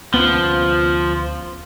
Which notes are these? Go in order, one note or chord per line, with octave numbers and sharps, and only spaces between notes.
D2 F3 B3 C#4